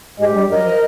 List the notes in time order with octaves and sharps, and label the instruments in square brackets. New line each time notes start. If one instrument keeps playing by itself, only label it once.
[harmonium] G#2 G#3 [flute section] G4
[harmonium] G2 G3
[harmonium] F#2 F#3 [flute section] A#4 D#5
[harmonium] F3